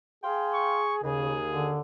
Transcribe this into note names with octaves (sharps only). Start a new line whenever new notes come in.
G#4 F5 G5 C6
C#6
D#2 C#3 G#4
D3